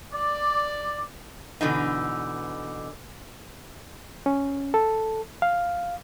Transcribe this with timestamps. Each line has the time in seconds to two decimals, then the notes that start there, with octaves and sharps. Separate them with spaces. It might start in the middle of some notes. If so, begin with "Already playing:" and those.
0.12 D5
1.61 B2 D3 E3 D#4
4.26 C#4
4.74 A4
5.42 F5